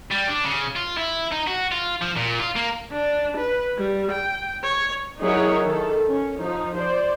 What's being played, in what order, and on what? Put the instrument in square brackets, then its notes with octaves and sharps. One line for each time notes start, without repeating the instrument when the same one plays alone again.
[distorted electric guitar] G3
D4
C#3
F4
E4
D#4
F#4
F4
F3
A#2
F4
A#3
[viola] D4
B4
G3
G5
C#5
[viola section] F#3 D#4 E4 G#4 A#4 C#5
D#3 A4
C#4
F3 D#4
C5 D5